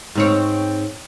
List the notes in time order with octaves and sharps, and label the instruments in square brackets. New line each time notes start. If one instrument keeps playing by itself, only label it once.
[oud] G#2 C4 C#5